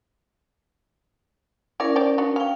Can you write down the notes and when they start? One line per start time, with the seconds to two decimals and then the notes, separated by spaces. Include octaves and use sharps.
1.80 C#4 E4 F#4 A#4 D5
1.96 C5 D5 G5
2.18 D4 F#4
2.36 C#4 F5 G5